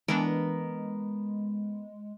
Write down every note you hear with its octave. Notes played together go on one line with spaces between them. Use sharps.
E3 G#3 B3 D4 A#4